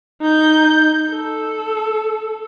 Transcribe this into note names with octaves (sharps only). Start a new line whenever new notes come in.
D#4 G6
A4